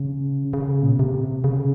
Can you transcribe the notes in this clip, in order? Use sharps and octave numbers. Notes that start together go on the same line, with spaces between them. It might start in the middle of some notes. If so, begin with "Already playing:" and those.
Already playing: C#3
C#3
A#2
B2
C3
C#3